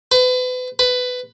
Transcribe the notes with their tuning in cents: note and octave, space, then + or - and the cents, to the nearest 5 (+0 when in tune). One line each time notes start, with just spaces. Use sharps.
B4 +35
B4 +15